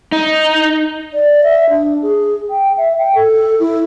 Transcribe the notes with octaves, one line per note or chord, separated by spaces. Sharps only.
D#4
D5
E5
D4
G#4
G5
E5
G5
A4
E4